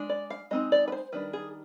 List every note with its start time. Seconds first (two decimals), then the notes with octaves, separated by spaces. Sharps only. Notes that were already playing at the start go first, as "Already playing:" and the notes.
Already playing: G#3 D4
0.09 D5
0.30 F5
0.51 G#3 C4 D#4 D#5
0.72 D5
0.88 B4
0.92 C5
1.12 D#3 G3 D4 B4
1.33 G#4